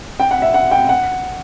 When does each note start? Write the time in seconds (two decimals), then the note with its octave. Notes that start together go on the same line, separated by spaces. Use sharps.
0.20 G5
0.31 F#5
0.42 E5
0.54 F#5
0.71 G5
0.89 F#5